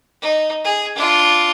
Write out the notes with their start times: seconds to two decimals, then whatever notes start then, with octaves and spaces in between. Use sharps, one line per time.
0.22 D#4
0.64 G#4
0.96 D4 F4